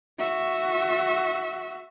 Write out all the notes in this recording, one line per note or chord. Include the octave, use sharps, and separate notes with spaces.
F#4 E5